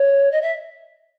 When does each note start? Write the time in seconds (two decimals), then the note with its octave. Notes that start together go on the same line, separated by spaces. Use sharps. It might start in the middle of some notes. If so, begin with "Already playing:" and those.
Already playing: C#5
0.31 D#5
0.42 E5